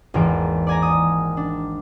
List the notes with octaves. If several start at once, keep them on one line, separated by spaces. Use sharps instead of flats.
G#1 E2 A#3 D7
D5 G#5 A#5
D#6
D4